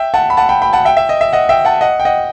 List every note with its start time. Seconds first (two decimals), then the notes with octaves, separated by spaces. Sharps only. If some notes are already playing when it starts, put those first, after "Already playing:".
Already playing: E5 G5
0.14 F#5 A5
0.30 B5
0.37 F#5 A5
0.49 G5 B5
0.62 G5 B5
0.73 F#5 A5
0.85 E5 G5
0.97 E5
1.09 D#5
1.21 E5
1.33 D#5 F#5
1.49 E5 G5
1.65 F#5 A5
1.81 D#5 F#5
2.00 G5
2.05 D#5 F#5